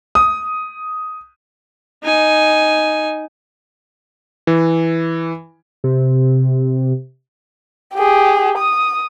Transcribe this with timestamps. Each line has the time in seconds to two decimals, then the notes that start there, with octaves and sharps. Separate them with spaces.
0.15 D#6
2.03 D#4 G#5
4.47 E3
5.84 C3
7.95 G4 G#4
8.58 D#6